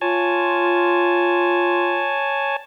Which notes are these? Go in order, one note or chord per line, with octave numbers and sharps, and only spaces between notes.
F4 C#5 G#5 A5